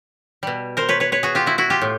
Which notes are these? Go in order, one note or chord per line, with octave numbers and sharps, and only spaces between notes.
B2 G3
A#4 C5
B4 C#5
B4 C#5
B4 C#5
F#4 G#4
F4 G4
E4 F#4
E4 F#4
F4 G4
A2